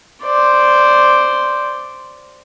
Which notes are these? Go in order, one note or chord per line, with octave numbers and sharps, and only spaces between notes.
C5 D5